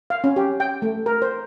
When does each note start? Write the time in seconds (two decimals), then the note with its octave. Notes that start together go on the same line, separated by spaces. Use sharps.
0.10 F5
0.24 C#4
0.36 G4
0.60 G5
0.82 A3
1.06 A#4
1.22 C5